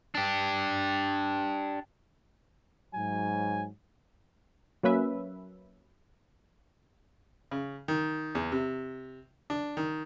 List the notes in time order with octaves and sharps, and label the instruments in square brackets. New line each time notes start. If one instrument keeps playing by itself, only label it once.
[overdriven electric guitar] D4 G4
[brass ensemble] G#2 F#3 [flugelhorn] G#5
[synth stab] F#3 A#3 C#4 B4 E5
[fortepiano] C#3
D#3
E2
C3
D4
D#3